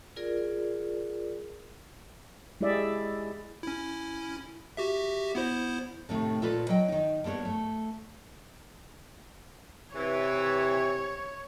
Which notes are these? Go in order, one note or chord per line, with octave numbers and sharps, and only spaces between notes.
F4 G#4 A#4 D5
G#3 E4 G4 G#4 D5 E5
C#4 E4
F#4 G4 E5
B3 E4 C5
A2 C3 D#3 A3
A#2 F4 A4 B4
F#3 D#5 G5
D#3 D#4
G2 A#3 B3 A#4 C#5
A3
C3 E3 C#5